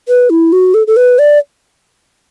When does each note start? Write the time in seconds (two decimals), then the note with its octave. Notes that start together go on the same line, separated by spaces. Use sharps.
0.08 B4
0.30 E4
0.52 F#4
0.74 A4
0.87 A4
0.97 B4
1.19 D5